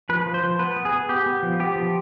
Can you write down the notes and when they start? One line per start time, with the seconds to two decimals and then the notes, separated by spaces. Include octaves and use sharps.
0.09 F3 B4
0.26 F3
0.34 C5
0.44 F3
0.59 B3 B4
0.76 B3
0.85 G#4
0.93 B3
1.09 B3 G4
1.26 B3
1.43 F3
1.59 B3 G4
1.76 F3